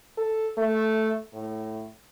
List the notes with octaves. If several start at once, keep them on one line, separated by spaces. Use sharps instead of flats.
A4
A3
A2